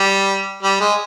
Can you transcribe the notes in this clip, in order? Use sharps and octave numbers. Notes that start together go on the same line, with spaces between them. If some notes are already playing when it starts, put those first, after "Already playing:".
Already playing: G3
G3
G#3